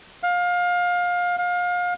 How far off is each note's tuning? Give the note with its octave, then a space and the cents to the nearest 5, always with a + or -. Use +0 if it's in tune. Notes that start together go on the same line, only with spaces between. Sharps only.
F5 +25
F5 +30